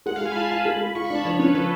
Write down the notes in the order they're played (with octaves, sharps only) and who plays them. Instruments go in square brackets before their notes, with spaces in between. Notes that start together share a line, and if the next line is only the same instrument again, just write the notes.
[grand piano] G#3 [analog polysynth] F#5
[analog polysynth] F5
[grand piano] G#3 [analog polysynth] G#5
[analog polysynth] B5
[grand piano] F4 [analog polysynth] A5
[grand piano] F4 [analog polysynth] B5
[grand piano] G#3
G#3
[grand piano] F4 [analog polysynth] C#6
[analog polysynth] B5
[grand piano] D4 [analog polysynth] A5
[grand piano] F3 [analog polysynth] C#5
[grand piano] C#4 [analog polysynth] B4
[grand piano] F3 [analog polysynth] A4